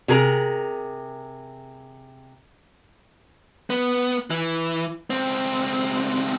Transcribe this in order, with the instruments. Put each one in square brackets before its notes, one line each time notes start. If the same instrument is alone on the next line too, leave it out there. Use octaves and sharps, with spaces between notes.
[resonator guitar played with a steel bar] C3 G#4 A#4 A#5
[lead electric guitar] B3
E3
C#2 C4